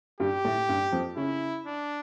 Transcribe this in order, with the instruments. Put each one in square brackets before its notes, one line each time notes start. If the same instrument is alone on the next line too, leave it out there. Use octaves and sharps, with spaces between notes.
[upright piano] G2 G3 [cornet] G4
[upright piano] A2 A3
G2 G3
F2 F3
[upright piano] C#3 C#4 [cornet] E4
[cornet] D4